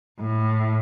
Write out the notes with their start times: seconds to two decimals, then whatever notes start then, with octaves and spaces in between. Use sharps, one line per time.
0.20 A2